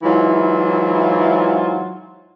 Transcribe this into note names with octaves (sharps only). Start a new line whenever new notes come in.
G#2 E3 F#3 E4 F4